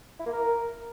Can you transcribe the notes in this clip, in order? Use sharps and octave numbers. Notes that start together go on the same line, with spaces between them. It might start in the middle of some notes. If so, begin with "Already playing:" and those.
E4
A#3
A#4